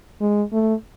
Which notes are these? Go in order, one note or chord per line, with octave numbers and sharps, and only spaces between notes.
G#3
A3